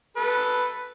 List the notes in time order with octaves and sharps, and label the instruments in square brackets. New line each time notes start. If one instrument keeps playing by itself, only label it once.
[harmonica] A4 B4